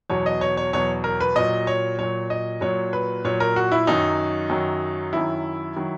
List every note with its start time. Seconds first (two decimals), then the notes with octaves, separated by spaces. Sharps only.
0.10 E2 B2 F#3 C#5
0.26 D#5
0.41 C#5
0.57 C#5
0.73 E2 B2 F#3 C#5
1.04 A#4
1.20 B4
1.36 A#2 F#3 D#5
1.67 C#5
1.99 A#2 F#3 C#5
2.30 D#5
2.61 A#2 F#3 C#5
2.93 B4
3.25 A#2 F#3 C#5
3.40 A#4
3.56 F#4
3.72 E4
3.87 F#2 D#3 F#3 D#4
4.50 F#2 D#3 F#3
5.13 F#2 D#3 F#3 E4
5.76 D#3 F#3